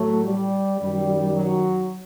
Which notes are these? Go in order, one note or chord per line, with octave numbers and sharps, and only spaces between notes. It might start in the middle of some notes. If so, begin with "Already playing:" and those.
Already playing: A2 F#3 A3
G3
F#2 D#3 G3
F#3